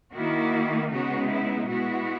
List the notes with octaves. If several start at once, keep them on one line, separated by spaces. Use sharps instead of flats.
D#3 A#3 E4 F#4
C#3 G#3 B3 D#4 F#4
E4
B2 G#3 B3 E4 F#4